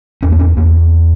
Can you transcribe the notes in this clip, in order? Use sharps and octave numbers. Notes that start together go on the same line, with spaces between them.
E2 C#4
A#3
C#4
E2 A#3